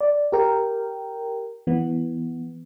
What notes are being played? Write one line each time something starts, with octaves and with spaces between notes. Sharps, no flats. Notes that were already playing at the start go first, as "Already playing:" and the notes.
D5
G4 A#4 G5
E3 B3